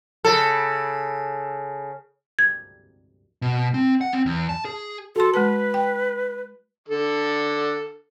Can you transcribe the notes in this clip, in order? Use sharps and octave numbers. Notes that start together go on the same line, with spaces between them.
C#3 A4
G#6
B2
C4
F#5
C4
E2
A5
G#4
F#4 A4 C6
G#3 B4 A5
G5
D3 A4